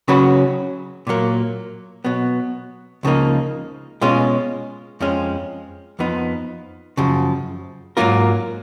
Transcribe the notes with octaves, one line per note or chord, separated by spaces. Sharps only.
C#3 F#3 C#4 F#4 B4
A#2 F#3 A#3
B2 F#3 B3
C#2 C#3 F3 A#3 D#4
B2 G#3 C#4 F4
F2 F3 G#3 C#4
F2 F3 B3 D#4
F#2 C#3 F3
G#2 F#3 A#3 F4 A#4